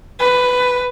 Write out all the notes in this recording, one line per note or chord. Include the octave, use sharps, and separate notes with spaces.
B4